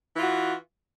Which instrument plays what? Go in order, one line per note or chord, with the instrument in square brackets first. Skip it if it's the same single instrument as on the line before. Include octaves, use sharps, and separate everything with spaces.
[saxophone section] E3
F4
F#4